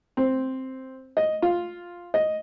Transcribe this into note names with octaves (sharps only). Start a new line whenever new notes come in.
C4
D#5
F4
D#5